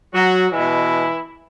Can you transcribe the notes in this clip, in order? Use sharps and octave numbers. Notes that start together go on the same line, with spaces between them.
F#3 F#4
B2 E3 G#3 E4